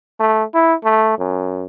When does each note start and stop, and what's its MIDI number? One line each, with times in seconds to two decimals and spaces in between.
0.20 0.44 57
0.54 0.74 64
0.84 1.14 57
1.19 1.66 42